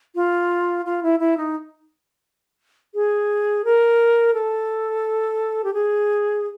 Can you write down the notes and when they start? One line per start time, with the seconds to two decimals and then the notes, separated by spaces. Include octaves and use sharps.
0.15 F4
0.86 F4
1.03 E4
1.19 E4
1.37 D#4
2.94 G#4
3.65 A#4
4.34 A4
5.64 G4
5.74 G#4